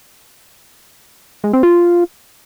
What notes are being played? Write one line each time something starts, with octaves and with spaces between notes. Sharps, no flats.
G#3
C4
F4